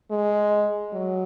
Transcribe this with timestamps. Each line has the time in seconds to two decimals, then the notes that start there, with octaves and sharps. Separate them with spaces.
0.11 G#3
0.94 F#3